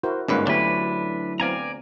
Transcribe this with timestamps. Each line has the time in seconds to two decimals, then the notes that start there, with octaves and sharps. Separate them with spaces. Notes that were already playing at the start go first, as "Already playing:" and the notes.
0.03 E4 F#4 A#4 C5
0.28 G1 G#2 A#3 C#4 F4 B4
0.47 D2 F#3 B3 D4 E4 G4 B4
1.40 B3 C4 D5 F5 G#5 A#5